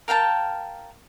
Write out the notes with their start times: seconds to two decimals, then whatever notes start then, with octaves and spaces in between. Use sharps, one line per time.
0.08 A#4 F5 G5 A5